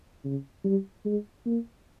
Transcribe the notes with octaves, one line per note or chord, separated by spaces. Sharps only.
C#3
G3
G#3
A#3